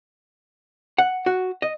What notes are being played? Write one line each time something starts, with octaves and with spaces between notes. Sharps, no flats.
F#5
F#4
D#5